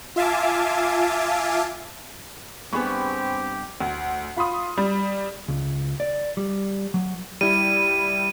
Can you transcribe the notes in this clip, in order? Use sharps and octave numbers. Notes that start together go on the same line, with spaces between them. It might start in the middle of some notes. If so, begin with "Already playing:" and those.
F4 E5 F5 G#5 A5 D6
G2 B3 C4 G4 G#4 B5 C#6
D2
F4 B5 C6 D#6
G3
C#2
D5
G3
F#3
G3 E4 D#7